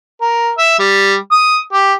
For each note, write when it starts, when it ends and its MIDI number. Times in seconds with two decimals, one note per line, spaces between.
0.21 0.50 70
0.58 0.77 76
0.79 1.16 55
1.32 1.58 87
1.73 1.93 67